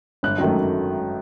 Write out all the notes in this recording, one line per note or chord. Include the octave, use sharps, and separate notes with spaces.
G1 F#6
F#2 D#3 F#3 A3